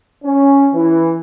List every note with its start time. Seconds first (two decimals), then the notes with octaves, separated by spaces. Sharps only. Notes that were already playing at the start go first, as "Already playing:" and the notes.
0.24 C#4
0.74 E3